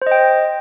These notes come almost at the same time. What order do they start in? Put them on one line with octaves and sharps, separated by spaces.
C5 D#5 G5